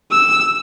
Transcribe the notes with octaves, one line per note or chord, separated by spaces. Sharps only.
E6